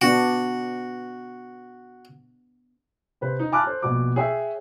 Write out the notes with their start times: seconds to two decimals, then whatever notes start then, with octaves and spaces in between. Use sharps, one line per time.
0.02 B3 D4 F#4
3.21 C3 B4 C5
3.39 D#4
3.52 G#5 A5 B5 D6 F6 F#6
3.64 A4 C5
3.82 A#1 B2 F#4 D6
4.16 G#4 C#5 E5 G5 E6